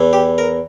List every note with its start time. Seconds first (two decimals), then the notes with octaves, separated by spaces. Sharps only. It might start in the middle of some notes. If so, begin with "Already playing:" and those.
Already playing: E2 E3
0.13 G4
0.38 A#4